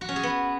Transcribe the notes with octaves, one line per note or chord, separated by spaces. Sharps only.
F#4
C#4
G#4
B3